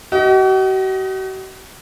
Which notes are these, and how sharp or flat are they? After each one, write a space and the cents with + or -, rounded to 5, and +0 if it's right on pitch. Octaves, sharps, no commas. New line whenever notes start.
F#4 +45 D#5 +15